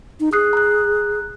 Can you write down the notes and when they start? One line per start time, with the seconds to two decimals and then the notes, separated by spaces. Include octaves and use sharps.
0.20 D#4
0.33 G#4 D#6 F#6 C7
0.53 A#5 F#6